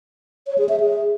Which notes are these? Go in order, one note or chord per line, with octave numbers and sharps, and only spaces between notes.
C#5
G#4
E5
G#4